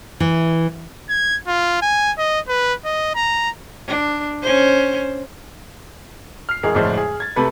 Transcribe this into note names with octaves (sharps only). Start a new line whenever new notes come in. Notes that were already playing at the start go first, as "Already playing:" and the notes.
E3
G#6
F4
G#5
D#5
B4
D#5
A#5
D4
C#4 C5
F6 C7
A1 G#3 G#4 A#4 C7
D1 F2 A2 G#3 C5 D5
G#4
G#6 A6
C3 A3 A4 B4 B5